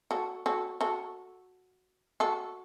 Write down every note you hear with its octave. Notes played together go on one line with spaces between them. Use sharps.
F#4 A4
F#4 A4
F#4 A4
F#4 A4